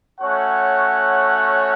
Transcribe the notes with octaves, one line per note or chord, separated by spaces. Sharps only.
A3 C#4 F#4 C#5 F#5